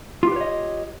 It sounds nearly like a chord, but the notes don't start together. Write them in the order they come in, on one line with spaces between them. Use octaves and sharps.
F4 G4 B4 C#5 D#5